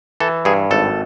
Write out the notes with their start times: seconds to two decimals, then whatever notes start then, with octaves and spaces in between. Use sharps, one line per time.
0.20 E3 A4
0.45 G2 G#4
0.71 G#1 A4